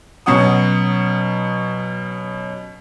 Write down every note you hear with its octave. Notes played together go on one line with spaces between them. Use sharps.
B2 F#3 C#4 F#5 D#6